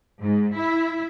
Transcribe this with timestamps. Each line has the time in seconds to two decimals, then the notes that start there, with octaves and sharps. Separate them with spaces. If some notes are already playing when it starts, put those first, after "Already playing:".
0.22 G#2
0.56 E4